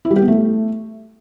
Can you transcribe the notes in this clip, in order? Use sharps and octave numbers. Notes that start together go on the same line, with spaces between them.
E4
G3
G4
B3
A3